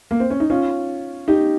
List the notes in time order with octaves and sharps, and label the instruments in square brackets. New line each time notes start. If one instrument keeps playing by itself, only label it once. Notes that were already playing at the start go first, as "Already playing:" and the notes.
[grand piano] A#3
C4
C#4
D#4
C#4 F4
D#4 G4